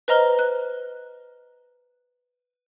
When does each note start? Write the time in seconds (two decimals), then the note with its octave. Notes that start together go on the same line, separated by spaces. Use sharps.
0.08 B4 C5 D#5 A#5 F6 G7
0.39 F#6